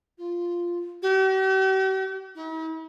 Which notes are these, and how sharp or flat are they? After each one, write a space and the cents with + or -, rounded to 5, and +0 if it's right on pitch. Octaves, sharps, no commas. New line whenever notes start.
F4 -5
G4 -45
E4 -45